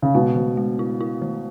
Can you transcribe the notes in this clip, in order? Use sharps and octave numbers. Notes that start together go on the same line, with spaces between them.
C#3
B2 G#3
D#3
G#3
E4
E4
D#3